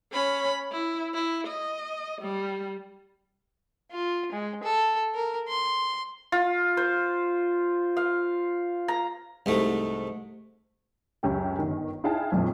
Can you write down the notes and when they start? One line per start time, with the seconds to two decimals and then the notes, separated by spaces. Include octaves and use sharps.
0.12 C#4 B5
0.72 E4
1.14 E4
1.47 D#5
2.21 G3
3.91 F4
4.32 G#3
4.63 A4
5.15 A#4
5.48 C6
6.32 F4
6.77 C5
7.97 F5
8.88 A#5
9.46 C2 G#2 A3
11.23 C#2 F#2 G4 C#5 G5
11.59 G1 D#3
12.04 D#4 E4 G#4 F5 G5 A5
12.32 A#1 F2 A#2 F3